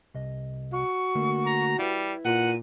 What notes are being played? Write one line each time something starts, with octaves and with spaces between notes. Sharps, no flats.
C2 D#5
F#4 C#6
D3 A3 A#3
A#5
G3 E4 B4
A#2 F#5 D#7